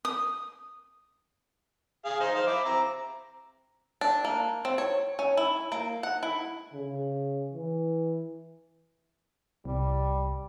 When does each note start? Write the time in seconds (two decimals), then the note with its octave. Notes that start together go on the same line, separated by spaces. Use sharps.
0.05 D#6
2.05 G#4 F5
2.20 D#4 C5
2.35 C5 F5
2.47 E4 D6
2.65 C4 A#5
4.01 D4
4.25 A#3
4.65 C4
4.78 C#5
5.19 C#4
5.37 E4
5.72 A#3
6.03 F#5
6.23 E4
6.73 C#3
7.53 E3
9.65 C2 G3